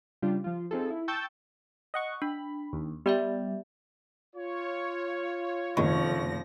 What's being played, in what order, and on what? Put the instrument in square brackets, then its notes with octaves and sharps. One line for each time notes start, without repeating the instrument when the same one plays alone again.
[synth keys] C#3 G3 D4 F4 G4
F3 F4
C4 D#4 F4 G#4 A4
E4
G5 A5 C#6 E6 G6 A6
[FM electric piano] D#5 F#5 C#6
[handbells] D4 [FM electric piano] B5
[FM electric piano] D#2
[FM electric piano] G3 [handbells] B3 D5 E5
[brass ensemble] F4 C#5
[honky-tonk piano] F#1 A3 C#6 [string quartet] C3 F3 A#6 [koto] D#3